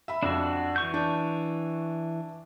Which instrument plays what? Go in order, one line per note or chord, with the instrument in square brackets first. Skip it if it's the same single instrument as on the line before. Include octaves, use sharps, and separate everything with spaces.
[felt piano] E5 B5
[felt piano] F2 [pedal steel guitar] D4 F#4
[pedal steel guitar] E3 C#6 G6
[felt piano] D4